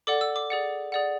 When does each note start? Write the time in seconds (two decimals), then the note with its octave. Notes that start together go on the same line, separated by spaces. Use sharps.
0.07 A4 D5 F#5 D6
0.21 E6
0.36 D6
0.50 G#4 D5 F#5
0.92 G#4 D5 F#5